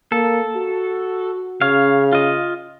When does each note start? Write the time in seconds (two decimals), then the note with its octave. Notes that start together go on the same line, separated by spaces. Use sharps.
0.12 A#3 A4
0.56 F#4
1.61 C#3 C#5 F5
2.13 F4 D#5